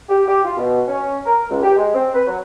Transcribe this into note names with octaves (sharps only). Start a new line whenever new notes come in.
G4
G4
F4
B2
C#4
A#4
C#2
G4
G#3
C4
B4
F#3